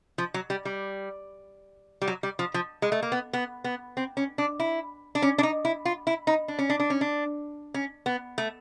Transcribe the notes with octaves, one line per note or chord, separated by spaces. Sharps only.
F3
F#3
G3
G3
G3
F#3
G3
F3
F3
G#3
A3
A#3
B3
B3
B3
C4
C#4
D4
E4
D4
C#4
D4
D#4
E4
F4
E4
D#4
D4
C#4
D4
D4
C#4
D4
C#4
B3
A3